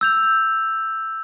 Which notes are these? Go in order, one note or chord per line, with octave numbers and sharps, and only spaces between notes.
E6 G6 F7